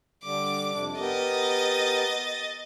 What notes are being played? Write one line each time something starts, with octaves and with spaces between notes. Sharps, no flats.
D3 G3 D6
F2 C3 D4
B3 G4 A#4 D#5 A6